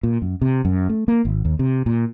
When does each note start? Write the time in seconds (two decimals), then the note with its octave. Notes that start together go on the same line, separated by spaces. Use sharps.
0.03 A#2
0.22 F#2
0.41 C3
0.65 F#2
0.89 A3
1.08 A#3
1.25 G#1
1.45 D#2
1.59 C3
1.86 A#2